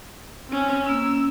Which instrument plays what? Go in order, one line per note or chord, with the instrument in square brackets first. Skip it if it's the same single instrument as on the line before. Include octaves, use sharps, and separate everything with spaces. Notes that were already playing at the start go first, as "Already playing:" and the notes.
[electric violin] C4 C#4
[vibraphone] A#3 C#4 [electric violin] E6